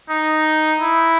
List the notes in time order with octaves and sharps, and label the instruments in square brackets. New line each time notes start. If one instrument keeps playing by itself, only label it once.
[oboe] D#4
E4